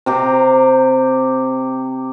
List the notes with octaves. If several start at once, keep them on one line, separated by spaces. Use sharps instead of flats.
C3 G4 A#5